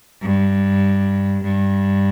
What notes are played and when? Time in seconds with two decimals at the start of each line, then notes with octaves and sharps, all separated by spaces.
0.22 G2
1.44 G2